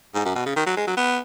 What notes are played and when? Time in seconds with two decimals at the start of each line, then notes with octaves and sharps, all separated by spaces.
0.15 G#2
0.25 F#2
0.35 B2
0.46 C#3
0.56 D#3
0.66 F#3
0.77 G#3
0.87 F#3
0.97 B3